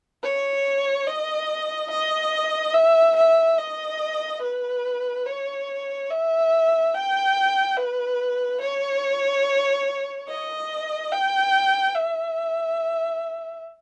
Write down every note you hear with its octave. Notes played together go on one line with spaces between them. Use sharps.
C#5
D#5
D#5
E5
E5
D#5
B4
C#5
E5
G5
B4
C#5
D#5
G5
E5